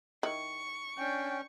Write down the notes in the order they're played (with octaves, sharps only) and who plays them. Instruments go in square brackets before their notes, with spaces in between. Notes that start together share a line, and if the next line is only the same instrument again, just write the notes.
[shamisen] D#3 E4 [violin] C#6
[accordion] C#4 [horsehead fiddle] D4 G5